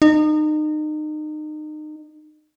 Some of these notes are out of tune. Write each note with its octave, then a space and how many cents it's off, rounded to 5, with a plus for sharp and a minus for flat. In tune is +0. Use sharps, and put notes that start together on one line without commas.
D#4 -30